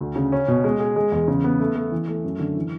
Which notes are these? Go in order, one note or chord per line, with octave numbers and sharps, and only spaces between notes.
D2
C#3
C#4
B2
G#3
G#4
G#3
E2
C#3
B3
A3
A3
E3
A3
F#2
D3
E3